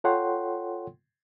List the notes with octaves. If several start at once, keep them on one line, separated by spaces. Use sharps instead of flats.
F4 A4 C#5 F#5 G5 C6